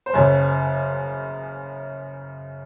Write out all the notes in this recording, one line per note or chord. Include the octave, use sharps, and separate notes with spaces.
C5
F#1 F#2 C#3 C#5